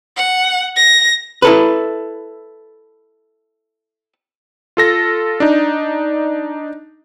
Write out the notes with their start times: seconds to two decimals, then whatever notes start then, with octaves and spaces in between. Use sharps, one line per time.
0.17 F#5
0.76 A#6
1.42 E4 A4 B4
4.77 F4 A4 A#6
5.40 D4 D#4